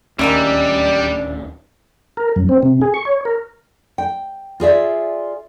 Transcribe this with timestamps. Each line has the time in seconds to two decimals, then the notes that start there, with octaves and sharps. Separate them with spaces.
0.19 D1 D#2 G3 G#3 A#3 C#4 D4 E4
2.17 A#4
2.36 F#2
2.49 C4
2.63 C3
2.81 G#4
2.94 C#6
3.05 C#5
3.25 A#4
3.98 G5
4.60 F4 G#4 D5 E5